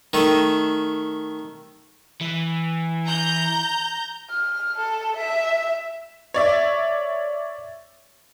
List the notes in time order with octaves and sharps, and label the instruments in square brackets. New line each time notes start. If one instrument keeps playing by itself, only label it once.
[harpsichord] D#3 A3
[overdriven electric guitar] E3
[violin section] A#5 G6
[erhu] F6
A4
E5
[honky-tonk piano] C#5 D5 E5